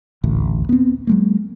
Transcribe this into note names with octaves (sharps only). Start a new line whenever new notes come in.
D#1 A1 D2
B3 C4
F#3 G#3 A#3